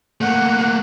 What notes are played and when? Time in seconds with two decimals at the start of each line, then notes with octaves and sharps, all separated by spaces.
0.21 A3 A#3 F#5